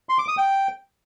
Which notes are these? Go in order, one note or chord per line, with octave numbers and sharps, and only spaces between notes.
C6
D6
D#6
G5